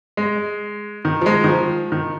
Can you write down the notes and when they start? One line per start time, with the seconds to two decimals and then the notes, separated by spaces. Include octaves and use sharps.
0.17 G#3
1.05 D#3
1.21 F3
1.26 G#3
1.44 D#3
1.48 F3
1.92 D#3